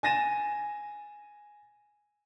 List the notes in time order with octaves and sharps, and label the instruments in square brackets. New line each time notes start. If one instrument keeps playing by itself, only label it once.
[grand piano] G#5 A6 A#6 D#7 E7